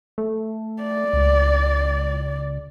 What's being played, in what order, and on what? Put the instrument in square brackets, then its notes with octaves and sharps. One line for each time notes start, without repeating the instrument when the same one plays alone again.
[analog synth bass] A3
[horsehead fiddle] D5
[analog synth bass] C#2